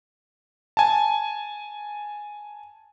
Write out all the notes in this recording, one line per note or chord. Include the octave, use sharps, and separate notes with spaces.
G#5 A5